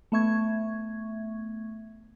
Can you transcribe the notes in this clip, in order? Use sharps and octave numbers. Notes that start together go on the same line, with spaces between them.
A3 B3 E5 C#6 G#6